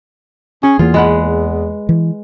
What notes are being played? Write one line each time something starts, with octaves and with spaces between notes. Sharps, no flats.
C#4 G#4
E2 E3 A#3 F4
G#3 B4 F#5
E3